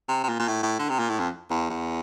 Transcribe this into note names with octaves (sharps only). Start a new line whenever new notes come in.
C3
C3
A#2
A#2
A2
A2
D3
C3
A#2
A2
F2
E2
E2